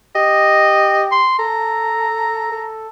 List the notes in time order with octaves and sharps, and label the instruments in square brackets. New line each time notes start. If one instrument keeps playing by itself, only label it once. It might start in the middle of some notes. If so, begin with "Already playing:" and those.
[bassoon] G4 [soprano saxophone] D#5
[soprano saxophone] C6
[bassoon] A4 [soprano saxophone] A#5
[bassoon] A4